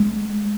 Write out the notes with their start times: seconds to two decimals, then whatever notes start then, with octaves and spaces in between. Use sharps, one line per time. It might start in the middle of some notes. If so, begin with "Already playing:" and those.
Already playing: G#3